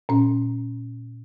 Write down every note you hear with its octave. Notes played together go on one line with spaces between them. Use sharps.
A#2 C#4